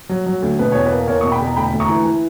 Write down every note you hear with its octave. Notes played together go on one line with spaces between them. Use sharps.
F#3
F#3
D2
B2 B4
E2 C#5
B4
A#3
E2 A#4 C#5
B2 C#6
G5 B5
E2
A#5
D2 G5 B5
D2
A#5 C#6
E3
E3